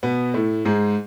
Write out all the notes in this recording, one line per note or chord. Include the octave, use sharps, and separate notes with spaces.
B2 B3
A2 A3
G#2 G#3